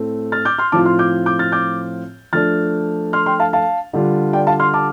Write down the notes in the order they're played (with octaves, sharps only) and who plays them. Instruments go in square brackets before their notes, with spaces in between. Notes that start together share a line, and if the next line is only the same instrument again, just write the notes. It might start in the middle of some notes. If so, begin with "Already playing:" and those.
Already playing: [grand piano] A2 A3 C4
F6 A6
D6 G6
C6 F6
A2 F3 C4 F4 A5 D6
C6 F6
D6 G6
D6 G6
F6 A6
D6 G6
F3 A3 D4 F6 A6
C6 F6
G5 C6
F5 A5
F5 A5
D3 G3 D4 F4
D5 G5
F5 A5
C6 F6
A5 D6